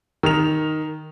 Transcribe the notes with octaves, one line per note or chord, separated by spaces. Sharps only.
D#3 F7